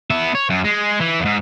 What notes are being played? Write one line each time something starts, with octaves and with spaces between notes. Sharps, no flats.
B3 E5
C#5
F#2
G#3
E3
E2 G#2